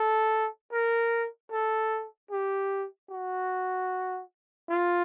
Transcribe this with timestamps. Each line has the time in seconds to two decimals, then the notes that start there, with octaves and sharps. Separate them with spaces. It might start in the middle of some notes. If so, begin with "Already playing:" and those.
Already playing: A4
0.72 A#4
1.51 A4
2.31 G4
3.10 F#4
4.69 F4